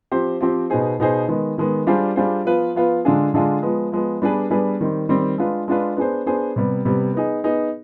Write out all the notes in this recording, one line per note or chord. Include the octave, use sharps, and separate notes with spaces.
F3 C4 G4 C5
F3 C4 G4 C5
B2 B3 D#4 G#4 C5
B2 B3 D#4 G#4 C5
D#3 G#3 B3
D#3 G#3 B3
G3 D4 F4 G#4 C5
G3 D4 F4 G#4 C5
F3 B3 F4 B4
F3 B3 F4 B4
D3 G#3 D4 F4 G#4
D3 G#3 D4 F4 G#4
F3 G#3 B3
F3 G#3 B3
G3 B3 D4 G#4 B4
G3 B3 D4 G#4 B4
D#3 G3 C4
D#3 G3 C4
G#3 D4 F4 B4
G#3 D4 F4 B4
B3 D4 G#4 C5
B3 D4 G#4 C5
C3 G3 B3
C3 G3 B3
B3 D#4 G#4
B3 D#4 G#4